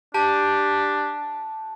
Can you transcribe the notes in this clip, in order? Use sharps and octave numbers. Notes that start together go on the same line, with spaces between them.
D4 G4 A5